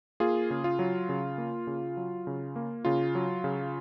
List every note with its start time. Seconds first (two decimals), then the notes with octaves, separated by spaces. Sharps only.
0.20 A#3 F4 G#4
0.50 C#3
0.64 F4
0.79 F#3
1.09 C#3
1.38 A#3
1.67 C#3
1.97 F#3
2.27 C#3
2.56 A#3
2.85 C#3 F4
3.15 F#3
3.44 C#3